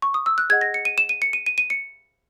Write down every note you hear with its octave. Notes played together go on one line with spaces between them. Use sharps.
C#6
D#6
E6
F#6
G#4 D#5 F#5 G#6
A#6
C#7
D#7
E7
D#7
C#7
D#7
D#7
D#7
C#7